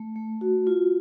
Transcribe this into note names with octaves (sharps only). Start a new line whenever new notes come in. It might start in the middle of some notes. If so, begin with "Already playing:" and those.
Already playing: A3
A3
F#4
F4